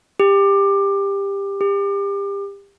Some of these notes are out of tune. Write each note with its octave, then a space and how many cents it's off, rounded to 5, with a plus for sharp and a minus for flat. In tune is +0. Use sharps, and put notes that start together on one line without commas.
G4 +20
G4 +30